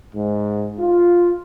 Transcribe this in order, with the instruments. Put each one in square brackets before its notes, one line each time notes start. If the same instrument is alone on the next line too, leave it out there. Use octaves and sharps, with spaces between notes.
[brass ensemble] G#2
F4